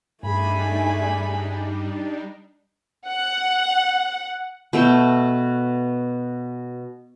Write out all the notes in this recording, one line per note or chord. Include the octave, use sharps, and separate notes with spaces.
G2 G3 A3 D4 D#4 G#4 G#5 B5
F#5
B2 A3 F#4 G5